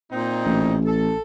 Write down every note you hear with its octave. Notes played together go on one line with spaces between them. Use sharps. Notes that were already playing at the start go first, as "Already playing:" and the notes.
A#2 C4 D#4
A1
A4